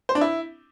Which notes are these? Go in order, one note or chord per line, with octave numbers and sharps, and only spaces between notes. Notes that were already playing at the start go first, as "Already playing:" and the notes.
C5
D4
E4